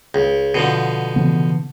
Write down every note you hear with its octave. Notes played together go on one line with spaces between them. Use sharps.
C#2
B2 D3 F3
C#3 E3 B3